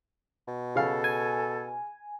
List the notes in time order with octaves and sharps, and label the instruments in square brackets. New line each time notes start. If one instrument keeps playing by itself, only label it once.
[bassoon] B2
[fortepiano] C#3 F5 [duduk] A4
[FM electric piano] G#5